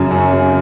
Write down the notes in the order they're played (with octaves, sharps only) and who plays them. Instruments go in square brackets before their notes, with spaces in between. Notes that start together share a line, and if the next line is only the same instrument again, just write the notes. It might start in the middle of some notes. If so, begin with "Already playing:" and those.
Already playing: [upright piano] F#2 C#3 C#4
F#2
C#3